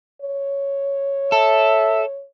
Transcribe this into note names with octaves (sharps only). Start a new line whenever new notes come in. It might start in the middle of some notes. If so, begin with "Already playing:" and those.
C#5
A4 E5